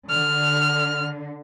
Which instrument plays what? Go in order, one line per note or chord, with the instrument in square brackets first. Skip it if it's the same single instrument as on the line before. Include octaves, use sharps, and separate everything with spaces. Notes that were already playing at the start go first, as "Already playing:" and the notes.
[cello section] D3 [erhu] F6